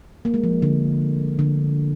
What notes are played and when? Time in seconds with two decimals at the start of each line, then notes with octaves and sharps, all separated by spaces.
0.25 A#3
0.34 G#3
0.44 F3
0.62 D3
1.39 D3